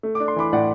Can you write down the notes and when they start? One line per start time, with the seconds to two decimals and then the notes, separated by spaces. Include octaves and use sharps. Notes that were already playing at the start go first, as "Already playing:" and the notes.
0.03 A3
0.15 D6
0.20 D4
0.28 C6
0.36 E3 B5 D6
0.53 A2 D5 F#5